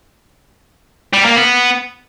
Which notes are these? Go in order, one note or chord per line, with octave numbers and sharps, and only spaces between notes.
G3
A#3
B3